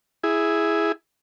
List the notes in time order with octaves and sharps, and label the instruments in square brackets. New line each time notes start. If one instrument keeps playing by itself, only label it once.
[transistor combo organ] E4 G#4